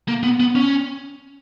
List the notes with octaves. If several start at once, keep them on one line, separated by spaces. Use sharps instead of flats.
A#3
B3
B3
C#4